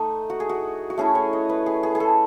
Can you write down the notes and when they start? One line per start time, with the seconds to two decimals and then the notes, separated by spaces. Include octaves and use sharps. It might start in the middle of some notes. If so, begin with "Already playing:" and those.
Already playing: A3 D#4
0.30 F#4
0.40 G#4
0.49 F#4
0.90 F#4
0.98 A3 C#4 E4 G#4
1.15 C#5
1.33 D#5
1.49 B4
1.66 G#4
1.83 G#4
1.95 G#4
2.00 A4